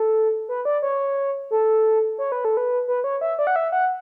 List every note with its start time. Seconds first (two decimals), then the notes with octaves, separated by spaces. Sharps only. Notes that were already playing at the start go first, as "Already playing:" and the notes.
Already playing: A4
0.49 B4
0.65 D5
0.82 C#5
1.51 A4
2.18 C#5
2.32 B4
2.45 A4
2.57 B4
2.88 B4
3.04 C#5
3.21 E5
3.39 D5
3.47 F#5
3.56 E5
3.72 F#5